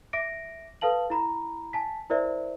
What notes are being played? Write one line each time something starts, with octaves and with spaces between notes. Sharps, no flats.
E5 D6 A#6 D7
A4 B4 F5 A5 F#7
E4 A#5 B5
G#5 A5 B6
E4 A#4 C5 D5 E5